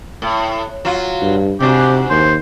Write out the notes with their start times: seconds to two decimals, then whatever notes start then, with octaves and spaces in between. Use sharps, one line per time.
0.22 A2
0.85 F#3 F4
1.22 G2
1.60 G#2 C3 D4 F#4 G4
2.10 D#2 C5